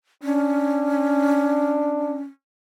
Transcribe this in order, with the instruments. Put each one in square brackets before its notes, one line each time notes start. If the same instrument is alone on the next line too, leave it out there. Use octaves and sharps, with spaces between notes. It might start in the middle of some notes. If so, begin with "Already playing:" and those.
[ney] C#4 [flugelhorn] D4